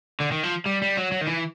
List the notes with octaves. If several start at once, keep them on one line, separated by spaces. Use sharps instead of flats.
D3
D#3
F3
G3
G3
F#3
F#3
D#3
E3